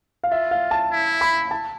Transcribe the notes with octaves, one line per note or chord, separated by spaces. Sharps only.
F5
F4 E5
F5
A5
E4
B5
A5